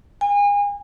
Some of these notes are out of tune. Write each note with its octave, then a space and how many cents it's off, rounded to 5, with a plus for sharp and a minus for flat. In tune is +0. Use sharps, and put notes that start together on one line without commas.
G#5 -35